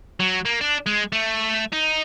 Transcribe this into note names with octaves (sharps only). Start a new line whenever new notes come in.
F#3
A#3
D4
G#3
A3
D#4